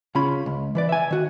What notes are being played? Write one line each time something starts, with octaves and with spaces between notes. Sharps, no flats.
C#3 C#4 F4 B5
C#2
E3 B4 D5
E5 G#5
D#3 F#4